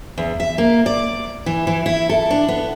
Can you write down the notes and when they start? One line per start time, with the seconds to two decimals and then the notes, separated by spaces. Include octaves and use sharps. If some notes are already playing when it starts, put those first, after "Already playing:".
0.18 E2
0.40 E5
0.58 A#3
0.86 D5
1.46 E3
1.67 E3
1.86 E4
2.09 A4
2.31 D4
2.48 B3